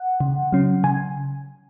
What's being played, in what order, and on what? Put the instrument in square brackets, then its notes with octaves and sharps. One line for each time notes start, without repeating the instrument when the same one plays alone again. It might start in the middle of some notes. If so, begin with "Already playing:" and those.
Already playing: [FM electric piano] F#5
C#3
F#3 C#4
C#3 G#5